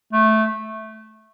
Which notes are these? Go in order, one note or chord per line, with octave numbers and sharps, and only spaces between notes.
A3